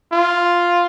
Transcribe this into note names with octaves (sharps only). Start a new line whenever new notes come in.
F4